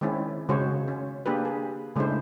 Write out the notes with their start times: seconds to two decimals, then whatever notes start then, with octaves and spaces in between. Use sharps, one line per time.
0.01 D#3 G#3 C4 C#4 E4
0.49 C#3 G#3 F#4 C5 C#5
0.88 C#4
1.26 A#3 D4 G4 G#4 B4
1.45 G#4
1.96 C#3 G#3 A3 D4 E4 C5